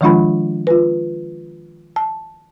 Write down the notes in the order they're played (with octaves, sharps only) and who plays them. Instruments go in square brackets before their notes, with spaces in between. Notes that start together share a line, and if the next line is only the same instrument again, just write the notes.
[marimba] D#3 F3 G#3 D4 F4 B5
F4 B4
A5